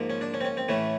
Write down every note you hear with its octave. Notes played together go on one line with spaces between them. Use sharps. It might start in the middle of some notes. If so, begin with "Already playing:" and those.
Already playing: G#2 F3 A#3
C#4
D4
C#4
C4
C#4
C4
A2 E3 A3 C#4